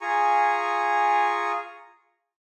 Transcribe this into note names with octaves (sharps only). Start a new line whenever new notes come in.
F4 G#4 G#5 A#5 C#6